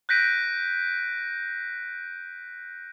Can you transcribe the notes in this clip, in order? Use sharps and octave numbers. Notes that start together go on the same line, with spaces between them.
F#6 G6 A#6 B6 D7 D#7